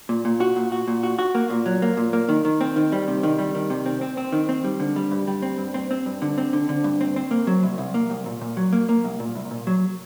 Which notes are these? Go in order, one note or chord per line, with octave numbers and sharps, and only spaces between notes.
A#2
A#2
F#4
A#2
F#4
A#2
F#4
F#4
A#3
A#2
F#3
A#3
A#2
A#3
D#3
D#3
C4
D#3
G3
C3
D#3
G3
D#3
C3
C4
C4
C4
D#3
C4
G3
D3
G3
G2
G3
C4
G2
C4
C4
G2
D3
C4
D3
D3
G2
C4
C4
A#3
F#3
C2
C2
A#3
C2
A#2
A#2
F#3
A#3
A#3
C2
A#2
C2
A#2
F#3